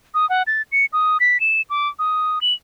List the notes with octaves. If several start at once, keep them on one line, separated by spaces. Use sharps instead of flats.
D#6
F#5
A6
C#7
D#6
B6
E7
D6
D#6
F#7